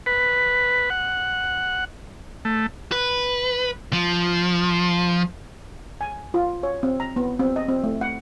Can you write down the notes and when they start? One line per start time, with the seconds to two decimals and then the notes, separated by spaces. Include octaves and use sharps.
0.06 B4
0.90 F#5
2.45 A3
2.92 B4
3.93 F3
6.01 G#5
6.34 F4
6.63 C#5
6.83 C4
7.00 A#5
7.16 B3
7.40 C4
7.56 D#5
7.68 C4
7.84 A3
8.01 F#5